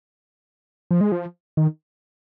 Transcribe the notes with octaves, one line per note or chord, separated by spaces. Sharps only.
F3
G#3
F3
D#3